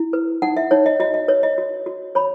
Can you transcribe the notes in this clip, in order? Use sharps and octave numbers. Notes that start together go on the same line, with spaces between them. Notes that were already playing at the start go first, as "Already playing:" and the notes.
Already playing: E4
B4
D#4 F#5
E5
D#4 C#5
D#5
F#4 D#5
D#5
B4 C#5
D#5
F#4
F#4
C#5 B5